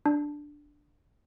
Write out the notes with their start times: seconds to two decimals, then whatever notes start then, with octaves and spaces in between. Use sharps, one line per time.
0.06 D4